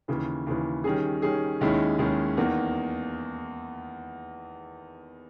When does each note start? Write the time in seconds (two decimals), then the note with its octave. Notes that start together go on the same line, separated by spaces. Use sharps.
0.08 D#2 C#3 E3
0.47 D#2 C#3 E3
0.84 D#3 G3 C#4 G#4
1.22 D#3 G3 C#4 G#4
1.61 D#2 D#3 G#3 C#4 E4
1.99 D#2 D#3 G#3 C#4 E4
2.37 E2 D#3 A#3